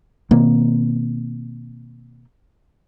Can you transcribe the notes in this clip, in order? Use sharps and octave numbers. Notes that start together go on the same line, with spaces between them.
B2 D#3 A#3 C4